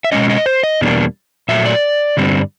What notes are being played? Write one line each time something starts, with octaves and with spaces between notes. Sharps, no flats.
E5
B2 G#3 C#4 D#5
D#5
C5
D#5
E2 B2 G3 A#3 D4
A#2 F#3 A3 E5
D5
G2 D3 G3 C4